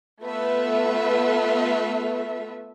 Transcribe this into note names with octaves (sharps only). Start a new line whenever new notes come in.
A3 B3 F4 B4 E5